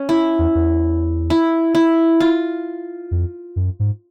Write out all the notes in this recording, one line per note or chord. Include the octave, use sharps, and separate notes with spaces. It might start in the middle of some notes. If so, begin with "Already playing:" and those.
Already playing: C#4
E4
E2
E2
E4
E4
F4
F2
F#2
G#2